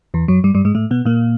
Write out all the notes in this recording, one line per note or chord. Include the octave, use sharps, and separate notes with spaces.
E2 E3
F#2 F#3
G2 G3
G2 G3
G#2 G#3
A2 A3
B2 B3
A#2 A#3